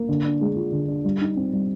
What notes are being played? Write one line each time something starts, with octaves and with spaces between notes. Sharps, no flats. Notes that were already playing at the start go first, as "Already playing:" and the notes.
Already playing: A#3
D3
D4
G#3
F4
D3
D4
G3
D#4
C4
G3